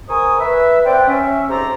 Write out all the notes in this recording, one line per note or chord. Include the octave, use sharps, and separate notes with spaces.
G#2 A#4 G#5 C#6 D#6
B4 E5
C4 C5 D5 F#5 G5
C#4 E5
F2 G#2 G4 A4 C5 A#5